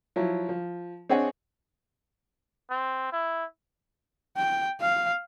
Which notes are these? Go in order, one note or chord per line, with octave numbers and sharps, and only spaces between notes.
F3 F#3 E4
F3
C4 D4 G#4 C#5 D#5 F#5
C4
E4
G5
F5